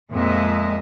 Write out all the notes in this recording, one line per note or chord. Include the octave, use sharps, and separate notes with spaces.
F2 A#2 G#3 D#5 E5